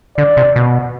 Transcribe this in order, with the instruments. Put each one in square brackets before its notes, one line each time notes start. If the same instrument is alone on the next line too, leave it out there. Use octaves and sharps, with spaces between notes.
[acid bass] D3 [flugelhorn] D5
[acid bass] C3
B2